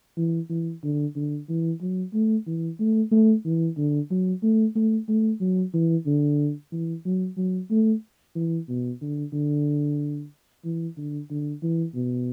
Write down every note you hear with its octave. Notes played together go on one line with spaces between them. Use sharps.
E3
E3
D3
D3
E3
F#3
A3
E3
A3
A3
E3
D3
F#3
A3
A3
A3
F#3
E3
D3
E3
F#3
F#3
A3
E3
B2
D3
D3
E3
D3
D3
E3
B2